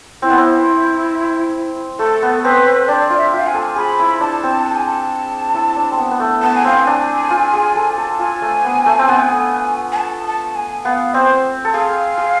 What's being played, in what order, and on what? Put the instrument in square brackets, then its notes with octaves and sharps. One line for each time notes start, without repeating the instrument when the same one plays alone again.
[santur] C4 [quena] E4
[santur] B3
C4
[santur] A3 [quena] A4
[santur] B3
[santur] C4 [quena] B4
[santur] C4
[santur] D4 [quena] D5
[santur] F4
[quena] E5
[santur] F4
[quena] F5
G#5
[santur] A4
[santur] G#4 [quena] B5
[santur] E4
[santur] D4 [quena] A5
[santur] C4
[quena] A5
G#5
A5
[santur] E4
D4
C4
B3
B3
A3
[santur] B3 [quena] A5
[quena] G#5
[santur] C4 [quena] F5
[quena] G#5
[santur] D4
F4
G#4
A4
A4
[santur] F4 [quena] G#5
[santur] A3
B3
A3
C4
B3
[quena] G#5
A5
A5
G#5
[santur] B3 [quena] F5
[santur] C4 [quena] C5
[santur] A4
[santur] G#4 [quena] F5
[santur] G#4